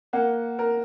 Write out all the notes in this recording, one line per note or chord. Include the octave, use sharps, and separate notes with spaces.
A#3 F#5
A#4